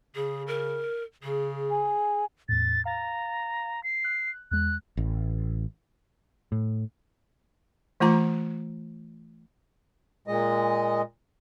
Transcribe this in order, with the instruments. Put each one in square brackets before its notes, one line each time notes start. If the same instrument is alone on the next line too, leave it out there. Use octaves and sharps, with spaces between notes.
[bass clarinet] C#3 [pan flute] G#4
[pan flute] A#4
[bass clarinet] C#3 [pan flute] G#4
[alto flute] G#5
[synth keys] E2 A2 [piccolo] A6
[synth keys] F5 A6 [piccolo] A#5
[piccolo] C7
[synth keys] F#6
[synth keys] E2 G#3 [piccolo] F#6
[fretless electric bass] A1
[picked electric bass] A2
[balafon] E3 A3 F4 A#5
[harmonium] A#2 G#3 D#5